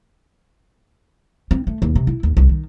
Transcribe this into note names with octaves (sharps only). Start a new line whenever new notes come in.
C4
A3
D#2
C3
E4
D#2
C2
D#3